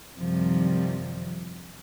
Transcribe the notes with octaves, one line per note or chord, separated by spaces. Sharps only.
F#2 C3 D#3 F3 G3